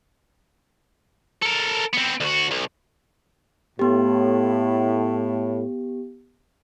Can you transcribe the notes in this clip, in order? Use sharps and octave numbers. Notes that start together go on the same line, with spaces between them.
A4 A#4
B3 C4
D2 F#4
B1
A2 B3 G4